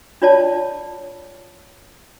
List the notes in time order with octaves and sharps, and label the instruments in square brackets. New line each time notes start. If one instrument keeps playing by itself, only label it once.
[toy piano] D4 F4 C#5 D5 A5